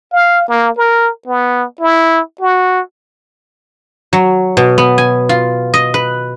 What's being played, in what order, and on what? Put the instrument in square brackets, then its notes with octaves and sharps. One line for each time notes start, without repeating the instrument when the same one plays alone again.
[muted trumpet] F5
A#3
A#4
B3
E4
F#4
[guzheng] F#3
B2
B3
G#5
F4
D#5
B4